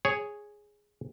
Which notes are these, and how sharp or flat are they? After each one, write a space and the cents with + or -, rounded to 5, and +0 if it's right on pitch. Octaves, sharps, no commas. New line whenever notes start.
G#4 +0 C#5 +0